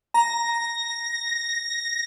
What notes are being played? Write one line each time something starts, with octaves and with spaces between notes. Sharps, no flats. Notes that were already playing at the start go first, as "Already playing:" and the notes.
A#5 A#6